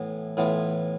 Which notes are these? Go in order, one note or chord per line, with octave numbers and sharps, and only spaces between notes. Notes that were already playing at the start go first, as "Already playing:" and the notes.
Already playing: A2 E3 B3
A2 E3 B3 F4